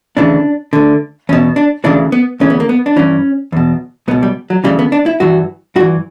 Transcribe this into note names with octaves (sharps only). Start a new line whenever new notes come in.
D2 C#3 E3 D4
D2 D3
E2 B2 C#4
D4
D2 C#3 E3 D4
B3
D2 C#3 E3 C#4
B3
A#3
B3
D4
G2 E3 C#4
E2 B2
C#2 B2 B3
G3
F#3
D2 C#3 E3 G3
B3
D4
E4
G2 E3 F#4
G2 E3 F#4